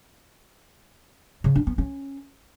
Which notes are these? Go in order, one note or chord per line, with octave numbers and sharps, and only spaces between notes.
C#3
D4
B3
C#4